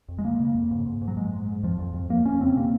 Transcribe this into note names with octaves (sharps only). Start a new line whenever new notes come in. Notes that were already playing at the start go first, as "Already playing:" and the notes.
F2
G#3
C#3 A#3
C#3
F2
G#2
G#2
G#2
F#3
G#2 G#3
G#2
G#2
F2 F3
F2
F2
F2 A#3
F2 C#4
C#3 C4
C3 A#3